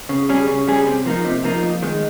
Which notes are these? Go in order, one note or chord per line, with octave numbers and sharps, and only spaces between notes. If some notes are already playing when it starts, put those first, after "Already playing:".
C#3
G3 C#4 G#4
C#3
G3 C#4 G#4
C3
F3 A#3 D#4
C3
F3 A#3 D#4
F2
D#3 G#3